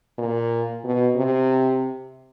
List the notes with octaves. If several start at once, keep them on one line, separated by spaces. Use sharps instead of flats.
A#2
B2
C3